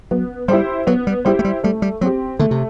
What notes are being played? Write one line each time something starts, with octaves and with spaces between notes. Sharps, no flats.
F#3 B3
G3 E4 G4 C5
F#3 B3
G3
G3 E4 G4 C5
A3
G3
G3 A3
G3
F#3 C4 G4
D3 A3
C3